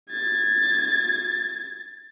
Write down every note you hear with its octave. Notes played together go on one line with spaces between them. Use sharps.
G#6 A6